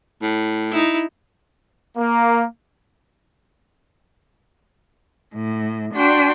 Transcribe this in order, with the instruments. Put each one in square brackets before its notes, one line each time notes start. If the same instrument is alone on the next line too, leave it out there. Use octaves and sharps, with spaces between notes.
[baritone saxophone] A2
[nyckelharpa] D#4 E4
[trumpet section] A#3
[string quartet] A2
D4 F#4 G5 C6